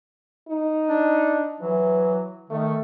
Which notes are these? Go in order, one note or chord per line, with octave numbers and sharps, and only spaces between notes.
D#4
D4
E3 F#3
D#3 A3